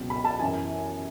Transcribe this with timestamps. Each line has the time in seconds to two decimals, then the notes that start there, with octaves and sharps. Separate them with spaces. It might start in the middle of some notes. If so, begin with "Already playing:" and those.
Already playing: C#2 B2 F#3
0.10 B5
0.25 A5
0.39 F#2 E3 G#5